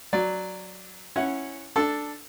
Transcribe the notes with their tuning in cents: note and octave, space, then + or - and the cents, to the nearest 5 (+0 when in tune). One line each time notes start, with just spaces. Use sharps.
F#3 +0 D5 +0
C#4 -10 E4 +5 F#5 +0
D4 +5 A4 +0